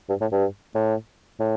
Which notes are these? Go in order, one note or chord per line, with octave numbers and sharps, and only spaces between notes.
G2
A2
G2
A2
A2